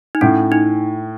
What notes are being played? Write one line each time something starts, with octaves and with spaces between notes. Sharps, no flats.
D#4
A2 C#4
D#4